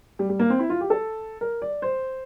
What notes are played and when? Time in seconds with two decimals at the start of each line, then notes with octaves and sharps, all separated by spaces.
0.19 G3
0.29 G3
0.39 A#3
0.50 C4
0.59 E4
0.70 F4
0.81 G4
0.90 A4
1.41 A#4
1.62 D5
1.82 C5